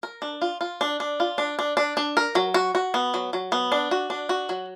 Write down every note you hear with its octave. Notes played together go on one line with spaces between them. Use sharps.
A#4
D4
F4
F4
D4
D4
F4
D4
D4
D4
D4
A#4
F#3
F#4
F#4
B3
F#3
F#3
B3
D4
F#4
D4
F#4
F#3